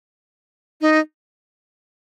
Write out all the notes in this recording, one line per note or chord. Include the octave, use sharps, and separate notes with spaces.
D#4